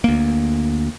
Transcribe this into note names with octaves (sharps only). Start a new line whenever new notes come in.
D2 A#3